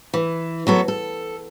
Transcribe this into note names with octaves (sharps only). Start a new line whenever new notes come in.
E3
F#3 B3 A4
A4